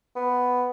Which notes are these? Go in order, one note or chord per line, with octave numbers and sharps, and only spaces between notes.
B3